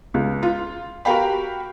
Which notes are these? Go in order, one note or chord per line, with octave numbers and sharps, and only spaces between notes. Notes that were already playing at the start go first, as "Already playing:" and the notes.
C#2
F4
F#4 G4 A#4 F5 G5 B5